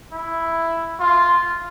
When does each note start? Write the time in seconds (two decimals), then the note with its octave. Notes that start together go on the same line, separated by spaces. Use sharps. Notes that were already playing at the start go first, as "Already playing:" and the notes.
0.13 E4
1.00 F4